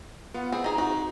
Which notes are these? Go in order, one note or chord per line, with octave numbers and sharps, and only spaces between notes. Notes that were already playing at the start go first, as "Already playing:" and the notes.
B3 F4 F#5
C4 G#4 B5
D#4 G#4 A#5
D#4 F#4